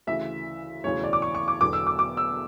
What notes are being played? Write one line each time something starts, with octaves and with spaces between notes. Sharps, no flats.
D2 C#3 E3 E5
E1 D2 C#3 E3 C#5
D5
D6
C#6
C#6
D6
E1 E2 D3 F#3 D6
E6
D6
D6
E6